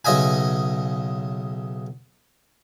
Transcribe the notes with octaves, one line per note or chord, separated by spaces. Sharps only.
B1 C#3 D#5 E5 G#5